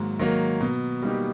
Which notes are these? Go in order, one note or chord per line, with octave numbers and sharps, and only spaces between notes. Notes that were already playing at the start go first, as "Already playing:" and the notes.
Already playing: G#2 D#3 F#3 A#3
D#3 F#3 A#3
B2
G3 A#3 D#4 G4